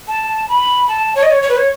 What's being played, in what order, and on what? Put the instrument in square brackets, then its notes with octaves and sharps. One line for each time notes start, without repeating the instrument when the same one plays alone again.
[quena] A5
B5
A5
C#5
D#5
C#5
C#5
B4
C#5